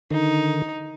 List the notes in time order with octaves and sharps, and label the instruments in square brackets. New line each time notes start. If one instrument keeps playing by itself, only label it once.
[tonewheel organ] D3 D#3 [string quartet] D#4